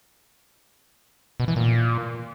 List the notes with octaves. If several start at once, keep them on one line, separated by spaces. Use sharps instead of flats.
B2
E3
A#2